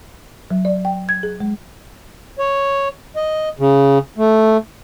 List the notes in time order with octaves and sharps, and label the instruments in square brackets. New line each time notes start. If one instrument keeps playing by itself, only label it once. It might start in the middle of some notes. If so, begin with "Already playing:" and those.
[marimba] F#3
D5
G5
G#6
G#4
G#3
[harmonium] C#5
D#5
C#3
A3